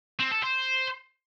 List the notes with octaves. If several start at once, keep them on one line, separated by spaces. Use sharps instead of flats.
C4
A4
C5